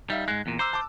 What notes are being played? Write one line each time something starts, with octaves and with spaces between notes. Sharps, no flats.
G3 D#4 E5 F5
G#2 G#3 F#6
E2 A#2
C5 A#5 D6 E6
A5 D6